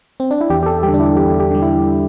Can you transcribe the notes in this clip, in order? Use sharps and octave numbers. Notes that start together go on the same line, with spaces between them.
C4
D4
E4
E2 G4
G4
A4
G3 G4
D3
D4
E4
E2 G4
G4
D3 G3
E4